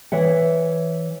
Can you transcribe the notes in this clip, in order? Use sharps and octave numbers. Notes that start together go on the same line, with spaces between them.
E3 C#5 E5 F#5